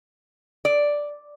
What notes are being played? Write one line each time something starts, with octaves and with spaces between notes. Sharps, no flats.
D5